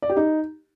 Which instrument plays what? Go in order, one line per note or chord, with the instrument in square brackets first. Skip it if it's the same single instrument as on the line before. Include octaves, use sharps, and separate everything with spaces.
[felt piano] D5
G4
D#4